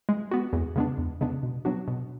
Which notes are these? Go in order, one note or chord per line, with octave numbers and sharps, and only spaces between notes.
G#3
B3 F#4
E2
C#3 G#3 B3 D4
E2
C#3 G#3 B3 D4
B2
F#3 B3 D4 F#4
B2